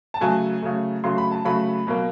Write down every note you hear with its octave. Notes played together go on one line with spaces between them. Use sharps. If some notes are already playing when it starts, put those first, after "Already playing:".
A5
C#3 F#3 A3 G#5
C#3 F#3 A3
C#3 F#3 A3 C6
B5
A5
C#3 F#3 A3 B5
B2 F#3 A#3